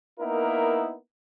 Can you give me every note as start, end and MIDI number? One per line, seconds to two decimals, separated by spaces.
0.20 0.95 58
0.20 0.95 59
0.20 0.95 63
0.20 0.95 64
0.20 0.95 70